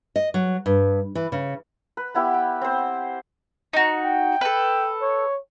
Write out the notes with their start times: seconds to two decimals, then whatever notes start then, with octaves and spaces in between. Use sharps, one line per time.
0.16 D#5
0.34 F#3
0.66 G2
1.15 E3
1.32 C#3
1.97 B4
2.15 B3 E4 G4
2.34 G5
2.61 C4 C5
3.73 D#4 F#4
4.05 G5
4.41 A4 B4
5.01 C#5